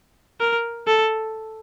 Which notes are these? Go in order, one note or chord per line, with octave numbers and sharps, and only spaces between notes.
A#4
A4